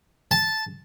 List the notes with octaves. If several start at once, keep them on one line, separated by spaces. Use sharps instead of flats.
A5